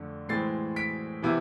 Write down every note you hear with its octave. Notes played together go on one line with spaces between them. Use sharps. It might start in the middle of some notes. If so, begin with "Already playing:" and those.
Already playing: F2 D3 A3
A2 E3 G#3 C4 A6 C7
B6 D7
C3 E3 B3 E4